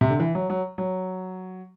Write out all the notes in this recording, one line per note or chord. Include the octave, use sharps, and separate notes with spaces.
C3
D3
E3
F#3
F#3
F#3